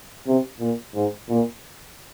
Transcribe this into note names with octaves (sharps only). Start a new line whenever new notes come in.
C3
A#2
G#2
A#2